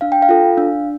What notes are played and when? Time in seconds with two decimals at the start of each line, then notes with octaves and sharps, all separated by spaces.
0.01 D4 F5
0.12 G5
0.22 F5
0.29 F4 A4
0.57 D4